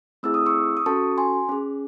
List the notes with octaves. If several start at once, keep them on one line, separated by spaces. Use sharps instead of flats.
A3 C4 E4 G#4 E6
D#6
C#6 E6
D#6
C#4 F#4 A4 A5 C#6
G#5 C6
C#4 G#4